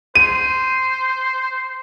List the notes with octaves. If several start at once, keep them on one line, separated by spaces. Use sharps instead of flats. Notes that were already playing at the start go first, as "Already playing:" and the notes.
C5 D#7